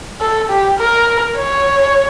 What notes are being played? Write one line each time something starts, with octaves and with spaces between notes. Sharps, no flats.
A4
G4
A#4
C#5